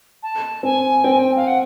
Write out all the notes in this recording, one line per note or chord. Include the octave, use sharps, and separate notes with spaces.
A5
C4 G#5
C4 G5
G#5
G5
F5
F#5